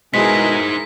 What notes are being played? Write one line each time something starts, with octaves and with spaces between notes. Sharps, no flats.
B2 G#3 D#4 E4 G#4 A#4 C5 B6